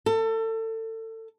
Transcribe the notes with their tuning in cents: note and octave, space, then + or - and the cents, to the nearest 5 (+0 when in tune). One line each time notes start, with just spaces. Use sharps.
A4 +30